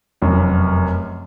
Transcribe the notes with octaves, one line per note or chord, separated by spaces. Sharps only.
F1 F#2